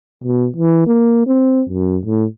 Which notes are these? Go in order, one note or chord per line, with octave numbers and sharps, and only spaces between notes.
B2
E3
A#3
C4
F#2
A2